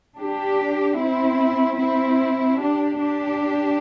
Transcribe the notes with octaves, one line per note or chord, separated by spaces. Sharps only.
D4 G4
C4 E4
C4 E4
D4 G4
D4 G4